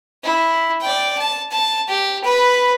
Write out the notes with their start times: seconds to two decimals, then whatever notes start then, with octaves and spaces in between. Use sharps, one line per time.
0.24 E4
0.81 D5 G5
1.18 A5
1.51 A5
1.88 G4
2.24 B4 B5